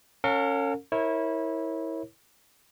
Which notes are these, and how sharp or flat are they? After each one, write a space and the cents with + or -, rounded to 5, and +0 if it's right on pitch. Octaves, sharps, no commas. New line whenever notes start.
C#4 +0 A#4 -45 F5 +45
E4 -20 A#4 +0 C#5 -25